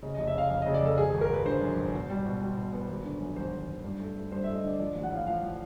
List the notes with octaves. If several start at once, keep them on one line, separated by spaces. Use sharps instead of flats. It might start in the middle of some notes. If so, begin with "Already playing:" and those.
C#3 D#5
D#5
F1
E5
C#3 F5
F2 F5
D#5
C#3
D5
F2 A4
G#1 G#4
G#4
G#1
A#4
G#1 B4
D3 C5
F#2
G#1
B2
G3
B2
G3
B2
B3
G#1
D3
F#2
G#1 C5
G#1
G#1
G2
A3
A3
G2 C5
E5
A3
D#5
D3 D5
F3 D5
A1
F#5
A2 F5
F3 F5
F3